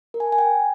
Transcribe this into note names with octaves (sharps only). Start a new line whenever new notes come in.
A#4
G#5
A5
G#5
G5